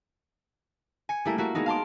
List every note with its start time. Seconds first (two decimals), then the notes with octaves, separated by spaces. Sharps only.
1.09 G#5 C#7
1.25 G3 A3 A#3 E4
1.38 A#3 E4 F#4
1.55 G#3 A#3 B3 D#4
1.66 F5 A5 C6 D6